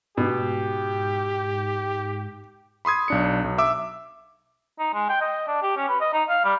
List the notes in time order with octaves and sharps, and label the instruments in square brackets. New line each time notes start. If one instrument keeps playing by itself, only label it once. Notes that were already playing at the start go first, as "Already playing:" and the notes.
[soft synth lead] G#2 [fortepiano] B2 [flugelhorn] G4
[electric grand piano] B5 C6 D#6 G#6
B1 D4 C#7
B1
E5 D6 E6
[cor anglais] D#4
G#3
G5
D#5
D4
G4
C#4
B4
D#5
D#4
F5
G3